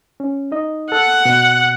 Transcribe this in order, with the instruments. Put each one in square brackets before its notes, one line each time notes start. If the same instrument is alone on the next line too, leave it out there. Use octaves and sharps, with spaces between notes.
[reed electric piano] C#4
D#4 D#5
[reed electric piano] A4 [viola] F#5
[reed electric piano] B2